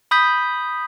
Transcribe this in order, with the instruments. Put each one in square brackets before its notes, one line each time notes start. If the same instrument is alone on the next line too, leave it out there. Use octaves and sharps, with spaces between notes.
[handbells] B5 D#6 G6 B6